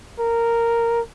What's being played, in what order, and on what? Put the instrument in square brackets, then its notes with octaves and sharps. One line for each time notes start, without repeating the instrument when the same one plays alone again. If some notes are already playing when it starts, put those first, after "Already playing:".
[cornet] A#4